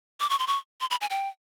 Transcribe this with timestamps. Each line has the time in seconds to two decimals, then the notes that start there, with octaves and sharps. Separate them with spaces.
0.20 D6
0.30 C#6
0.39 C6
0.47 C#6
0.81 C6
0.91 B5
1.01 G#5
1.10 G5